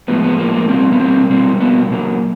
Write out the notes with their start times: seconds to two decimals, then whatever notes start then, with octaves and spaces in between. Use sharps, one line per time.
0.08 A2 F3 G#3 B3
0.23 B3
0.38 A2 F3 G#3 A#3
0.54 A#3
0.69 B2 G3 A#3 C4
0.92 B3
0.99 B2 G3 A#3 C4
1.30 B2 G3 A#3 C4
1.60 B2 G3 A#3 B3
1.91 A#2 F#3 A#3